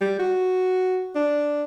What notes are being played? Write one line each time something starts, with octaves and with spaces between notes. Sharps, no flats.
G3
F#4
D4